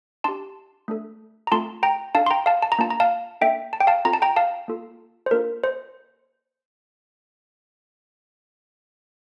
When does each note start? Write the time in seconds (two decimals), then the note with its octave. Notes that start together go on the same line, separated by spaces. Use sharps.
0.24 D4 G4 A5 C6
0.88 A3 D4 A4
1.47 A#5
1.52 A3 C4 F4 A4 A5 C6
1.83 G5 A#5
2.15 D4 A4 F5 A5
2.26 C6
2.31 G5 A#5
2.46 F5 A5
2.62 A5
2.72 A#5
2.79 A#3 D4 F4 A5
2.90 A#5
3.00 F5 A5
3.41 A#3 D4 A4 E5 G5
3.73 A5
3.80 G5
3.87 F5 A5
4.05 C4 F4 A4 A#5
4.13 A5
4.22 G5 A#5
4.36 F5 A5
4.68 A#3 F4 A4
5.26 C5
5.31 A#3 D4 F4 A4 A#4
5.64 C5